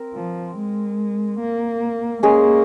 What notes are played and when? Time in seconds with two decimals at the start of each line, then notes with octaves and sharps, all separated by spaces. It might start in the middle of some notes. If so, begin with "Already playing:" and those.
Already playing: C4 A#4
0.15 F3
0.57 G#3
1.40 A#3
2.23 G#3 A#3 C#4 G#4